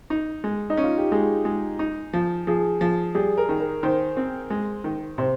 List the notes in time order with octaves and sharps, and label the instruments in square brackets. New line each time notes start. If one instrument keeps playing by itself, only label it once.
[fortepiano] D#4
G#3
[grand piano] D#4
[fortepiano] C#4
[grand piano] F4
G4
[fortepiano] G#3 [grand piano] G#4
[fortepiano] G#3
D#4
F3
[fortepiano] F3 [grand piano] G#4
[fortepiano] F3
[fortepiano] G3 [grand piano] G#4
[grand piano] A#4
[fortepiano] D#3
[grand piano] A#4
[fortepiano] D#3 [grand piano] C5
[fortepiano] C4
G#3
D#3
[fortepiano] C3 [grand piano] C5